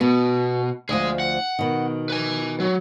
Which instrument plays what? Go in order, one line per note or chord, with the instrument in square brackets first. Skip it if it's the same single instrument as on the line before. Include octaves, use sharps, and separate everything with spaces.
[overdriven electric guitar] B2 [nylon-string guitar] B3
[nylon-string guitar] D2 F3 [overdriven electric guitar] G#4 D#5
[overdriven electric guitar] F#5
[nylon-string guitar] B2 D#3
[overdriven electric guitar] B4 G#5
F#3